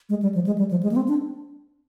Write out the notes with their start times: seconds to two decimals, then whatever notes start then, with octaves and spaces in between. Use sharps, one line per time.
0.09 G#3
0.22 G3
0.34 F3
0.46 G#3
0.58 G3
0.71 F3
0.83 G#3
0.91 A#3
0.96 C4
1.08 D4